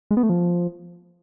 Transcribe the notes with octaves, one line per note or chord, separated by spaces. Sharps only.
G#3
B3
A3
F3